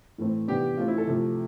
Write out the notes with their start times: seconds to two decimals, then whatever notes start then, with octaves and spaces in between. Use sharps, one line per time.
0.18 A2 E3 A3 C4
0.48 C3 E3 B3 D4 G4
0.77 E3 A3 C4 F4
0.88 E4
0.98 A4
1.08 C3 F3 A3